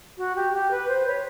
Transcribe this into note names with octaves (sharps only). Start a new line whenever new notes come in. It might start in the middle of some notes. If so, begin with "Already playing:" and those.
F#4
G4
G4
B4
C5
B4 C#5